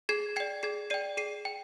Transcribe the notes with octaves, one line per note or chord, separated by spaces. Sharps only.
G#4 G#6 C7
D5 G5 G#6 C7
G#4 G#6 C7
D5 G5 C7 D#7
G#4 C7 D#7
G5